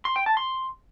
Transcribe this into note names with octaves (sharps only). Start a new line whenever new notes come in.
C6
G5
A5
C6